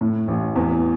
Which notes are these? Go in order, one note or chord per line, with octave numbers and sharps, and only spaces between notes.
A2
A1
E2